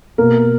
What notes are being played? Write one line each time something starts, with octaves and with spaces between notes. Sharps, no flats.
B2 A#3 A#4